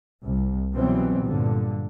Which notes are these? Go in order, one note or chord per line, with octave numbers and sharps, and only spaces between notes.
C2
B2 E3 F#3 G3 B3 C4
G2 A#2 D3